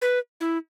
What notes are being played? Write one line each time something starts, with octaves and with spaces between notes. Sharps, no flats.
B4
E4